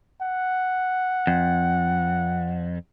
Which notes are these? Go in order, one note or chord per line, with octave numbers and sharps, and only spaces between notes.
F#5
F2